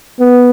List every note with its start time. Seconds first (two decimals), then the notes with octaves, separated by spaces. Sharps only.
0.20 B3